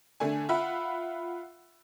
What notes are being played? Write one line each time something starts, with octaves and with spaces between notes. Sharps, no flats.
D3 A3 D4 G#5
F4 E5 F#5 B5